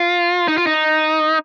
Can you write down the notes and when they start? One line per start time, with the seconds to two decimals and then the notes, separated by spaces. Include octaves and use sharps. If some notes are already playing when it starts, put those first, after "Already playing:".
Already playing: F4
0.48 D#4
0.57 F4
0.67 D#4